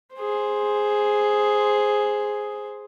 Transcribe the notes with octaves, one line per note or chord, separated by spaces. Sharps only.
G#4 C5